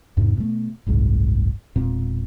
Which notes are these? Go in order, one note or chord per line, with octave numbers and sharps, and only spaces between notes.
E2 G#2 C3
B2 A3
F#1 C2 G#2
E1 A#2 C4